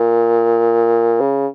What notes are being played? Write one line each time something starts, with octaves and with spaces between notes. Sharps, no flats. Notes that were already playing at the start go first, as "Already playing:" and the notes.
Already playing: A#2
C#3